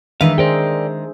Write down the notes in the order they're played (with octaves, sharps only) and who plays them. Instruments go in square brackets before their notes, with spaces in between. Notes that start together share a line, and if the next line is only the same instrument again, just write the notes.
[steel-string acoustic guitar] D#3 G#3 [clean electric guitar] E3 B4 F5 [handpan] D4 E5
[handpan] G#4 C5 [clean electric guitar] A#4 D5 G5